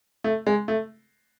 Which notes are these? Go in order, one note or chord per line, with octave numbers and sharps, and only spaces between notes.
A3
G#3
A3